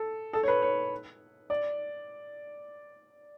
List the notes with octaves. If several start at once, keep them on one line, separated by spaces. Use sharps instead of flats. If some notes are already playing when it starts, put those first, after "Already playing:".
Already playing: A4
A4
C#5
B4
C#5
D5